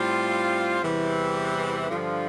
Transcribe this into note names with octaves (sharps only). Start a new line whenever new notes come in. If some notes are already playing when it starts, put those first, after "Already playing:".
Already playing: A2 G3 C4 F4
E2 C3 E3 G3
G2 D3 F3